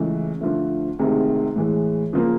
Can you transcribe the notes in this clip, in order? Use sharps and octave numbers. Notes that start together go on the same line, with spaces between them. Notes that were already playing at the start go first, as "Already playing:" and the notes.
Already playing: C#2 C#3 E3 A3
D3 F3 A3
D2 C3 D#3 G#3
A2 E3 G#3
C#3 F3 A#3